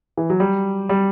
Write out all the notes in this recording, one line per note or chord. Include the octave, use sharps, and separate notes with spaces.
E3
F#3
G3
G3